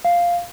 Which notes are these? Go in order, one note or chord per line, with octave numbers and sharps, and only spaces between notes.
F5